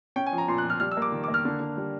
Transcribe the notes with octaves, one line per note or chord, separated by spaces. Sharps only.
C#4 G5
G#5
F3
A#5
A#2 C6
F#6
F3
F6
G3 F6
E6
A#3
D6
D#3
D6
A#3
F6
D3
D3
G3